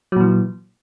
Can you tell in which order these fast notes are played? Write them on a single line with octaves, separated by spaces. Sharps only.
F#3 A#2 E3